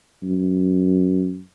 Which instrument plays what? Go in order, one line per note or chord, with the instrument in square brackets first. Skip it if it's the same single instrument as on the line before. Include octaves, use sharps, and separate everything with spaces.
[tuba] F#2